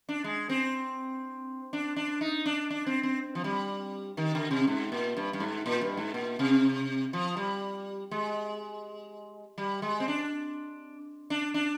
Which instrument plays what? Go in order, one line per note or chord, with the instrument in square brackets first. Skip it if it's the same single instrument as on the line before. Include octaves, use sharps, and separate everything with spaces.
[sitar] D4
G#3
C4
D4
D4
D#4
D4
D4
C4
C4
F3
G3
D#3
D3
C3
G#2
A#2
G2
G2
G#2
A#2
G2
G#2
A#2
C3
F3
G3
G#3
G3
G#3
C4
D4
D4
D4